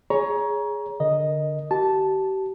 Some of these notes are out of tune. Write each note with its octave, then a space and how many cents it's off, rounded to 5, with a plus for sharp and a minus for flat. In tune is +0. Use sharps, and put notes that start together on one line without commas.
G#4 +0 C#5 +15 A#5 +25
D3 +0 A#4 +0 D#5 +0
G4 -35 A5 -5